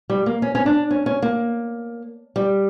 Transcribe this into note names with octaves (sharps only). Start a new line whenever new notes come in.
G3
A#3
C#4
C#4
D4
C#4
C#4
A#3
G3